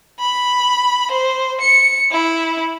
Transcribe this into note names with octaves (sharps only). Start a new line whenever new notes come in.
B5
C5
C#7
E4